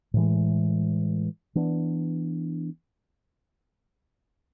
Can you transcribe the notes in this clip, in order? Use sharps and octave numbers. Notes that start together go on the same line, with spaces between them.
A2 E3 G#3
E3 B3 D4